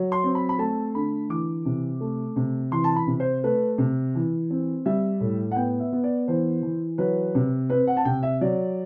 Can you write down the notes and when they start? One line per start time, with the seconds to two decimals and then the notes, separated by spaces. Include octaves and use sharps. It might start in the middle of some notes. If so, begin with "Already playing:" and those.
Already playing: F#3
0.12 C6
0.24 C4
0.35 B5
0.49 B5
0.59 A3 A5
0.95 D3 B5
1.29 E3 D6
1.65 C3
2.01 A3
2.36 C3
2.72 E3 C6
2.84 A5
2.96 B5
3.07 C3
3.20 C5
3.44 A3 B4
3.78 C3
4.15 E3
4.50 C4
4.86 G3 E5
5.20 A2
5.51 F#5
5.56 B3 G5
5.80 E5
5.93 B3
6.04 D5
6.28 E3 C5
6.63 E3
6.98 F#3 B4
7.35 C3
7.70 C4 B4
7.87 F#5
7.97 A5
8.05 C3 G5
8.23 E5
8.41 F#3 D5